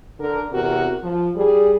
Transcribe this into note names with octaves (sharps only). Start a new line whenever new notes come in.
D3 A#4
E2 C3 F#4 A#4
F3
G3 G#4